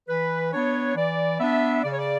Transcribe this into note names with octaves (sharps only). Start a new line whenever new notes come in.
E3 B4
B3 D4 C#5
E3 D5
B3 D4 E5
C#3 D5
C#5
D5